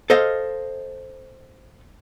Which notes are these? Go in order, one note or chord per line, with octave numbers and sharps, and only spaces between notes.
A4 C5 D#5 F5